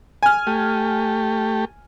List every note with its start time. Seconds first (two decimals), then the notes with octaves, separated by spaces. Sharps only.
0.23 G#5 F6
0.47 A3 G4